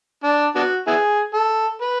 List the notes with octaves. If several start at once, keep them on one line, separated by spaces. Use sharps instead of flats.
D4
B3 D4 F#4
B3 E4 G#4
A4
B4